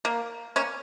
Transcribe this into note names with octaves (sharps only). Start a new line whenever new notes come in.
A#3
A#3 C#4